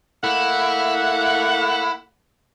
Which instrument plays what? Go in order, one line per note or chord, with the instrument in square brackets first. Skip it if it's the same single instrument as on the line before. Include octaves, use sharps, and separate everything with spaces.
[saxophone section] A3 A#3 F#5 [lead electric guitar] E4